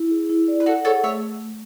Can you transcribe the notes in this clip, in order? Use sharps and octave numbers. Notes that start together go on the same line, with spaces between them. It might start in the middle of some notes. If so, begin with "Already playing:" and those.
Already playing: E4
G#4
E4
D5
B4
F#4 A4 F#5
G#4 A4 C#5
A3 C#5 E5